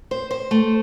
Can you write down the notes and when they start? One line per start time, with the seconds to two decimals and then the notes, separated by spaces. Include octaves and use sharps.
0.11 C5
0.31 C5
0.51 A3